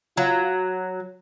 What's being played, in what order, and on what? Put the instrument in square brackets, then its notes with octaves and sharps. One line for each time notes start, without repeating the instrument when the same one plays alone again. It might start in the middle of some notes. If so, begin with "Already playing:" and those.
[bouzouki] F#3 [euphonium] F4